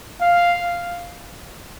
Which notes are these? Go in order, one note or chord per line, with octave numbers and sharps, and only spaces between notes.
F5